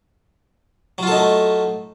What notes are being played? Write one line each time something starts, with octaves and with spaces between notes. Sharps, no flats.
F#3 A3 D#4 F4 A4